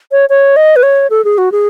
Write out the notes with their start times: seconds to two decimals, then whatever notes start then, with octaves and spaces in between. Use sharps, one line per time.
0.12 C#5
0.30 C#5
0.56 D#5
0.76 B4
0.83 C#5
1.10 A4
1.25 G#4
1.38 F#4
1.52 G#4